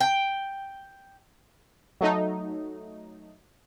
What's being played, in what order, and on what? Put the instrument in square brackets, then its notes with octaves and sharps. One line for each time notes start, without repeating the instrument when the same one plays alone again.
[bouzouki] G5
[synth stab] F#3 A3 D#4